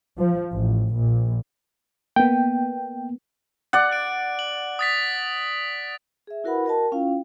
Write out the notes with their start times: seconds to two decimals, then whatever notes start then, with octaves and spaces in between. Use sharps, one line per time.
0.18 F3
0.53 A1
0.96 A#1
2.16 A#3 B3 G5
3.73 D5 F#5
3.91 F#6 D7
4.39 F#7
4.79 D#6 A6 B6
6.27 G#4 E5
6.44 E4 F#4 A#4 B4 F#5 B5
6.65 F#4 A#4 D#5 G5 A5
6.92 C#4 E4 F4 F5 G5